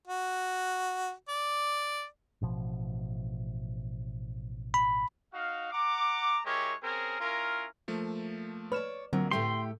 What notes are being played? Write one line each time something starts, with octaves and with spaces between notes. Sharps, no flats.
F#4
D5
A1 B2 F3
B5
D#4 F#4 F5
F#5 A#5 D6
G#3 E4 G4 A#4 C#5
C4 C#4 G#4 A#4
C#4 E4 F4 A#4
F3 A3 A#3
B4 C#5 D5 F6 E7
A#1 A#2 D3 F#3 C4 A#4
A2 A3 G4 G5 C6